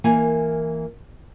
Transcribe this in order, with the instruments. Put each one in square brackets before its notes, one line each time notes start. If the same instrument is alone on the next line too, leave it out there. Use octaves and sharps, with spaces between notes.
[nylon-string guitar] E3 A#3 A#4 G#5